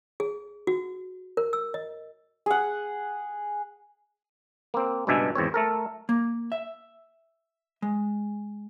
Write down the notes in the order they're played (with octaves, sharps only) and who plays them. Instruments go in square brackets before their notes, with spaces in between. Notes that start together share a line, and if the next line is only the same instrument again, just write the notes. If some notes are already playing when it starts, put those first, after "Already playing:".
[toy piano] G#4
F#4
A#4
E6
D#5
[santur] G#4 F#5
[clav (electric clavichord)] A#3 C4
C#2 G2 B2 D4 E5 G#5
G#1 E2 C4 C#5
A3 A4 A#4
[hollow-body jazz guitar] A#3
E5
G#3